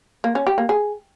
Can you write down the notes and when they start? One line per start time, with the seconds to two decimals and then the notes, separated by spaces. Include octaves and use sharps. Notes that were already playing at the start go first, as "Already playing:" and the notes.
0.24 A#3
0.35 C#4
0.47 G4
0.58 A#3
0.69 G#4